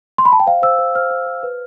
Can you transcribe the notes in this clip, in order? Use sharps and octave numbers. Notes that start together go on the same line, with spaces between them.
C6
B5
A5
G5
C5 F5
C5 E6
C5
C5 F6
C5
C5
B4